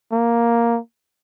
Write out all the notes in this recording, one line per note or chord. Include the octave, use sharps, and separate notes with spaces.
A#3